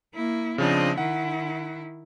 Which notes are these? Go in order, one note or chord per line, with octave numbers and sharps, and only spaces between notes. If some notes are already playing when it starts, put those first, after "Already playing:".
A#3 E4
C#3 F3 C4 D4 D#5
D#3 E4 F#5